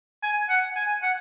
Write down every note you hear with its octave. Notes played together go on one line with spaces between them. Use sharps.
G#5
F#5
G#5
F#5